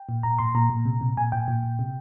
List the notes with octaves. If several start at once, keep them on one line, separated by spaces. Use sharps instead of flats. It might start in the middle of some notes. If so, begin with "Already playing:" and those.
Already playing: G5
A#2
A#2 A#5
A#2 C6
A#2 A#5
A#2
C3
C3
A#2 G#5
A#2 G5
A#2
A#2
C3